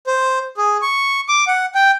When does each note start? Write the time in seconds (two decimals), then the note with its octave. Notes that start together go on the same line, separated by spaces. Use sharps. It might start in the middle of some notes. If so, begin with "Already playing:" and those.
0.07 C5
0.57 G#4
0.82 C#6
1.29 D6
1.47 F#5
1.75 G5